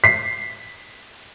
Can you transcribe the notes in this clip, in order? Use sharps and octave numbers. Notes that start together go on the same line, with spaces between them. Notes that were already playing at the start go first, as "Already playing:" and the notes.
B6 C7